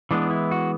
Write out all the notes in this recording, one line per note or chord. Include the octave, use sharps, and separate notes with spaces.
E3 G#3 B3 D4
E4
F#4